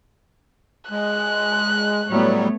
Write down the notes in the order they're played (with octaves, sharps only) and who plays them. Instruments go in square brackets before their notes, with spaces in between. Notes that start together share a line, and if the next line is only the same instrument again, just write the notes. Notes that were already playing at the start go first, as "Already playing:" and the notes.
[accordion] G#3 [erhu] F#6
[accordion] A2 F#3 G3 [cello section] A3 B3 C#5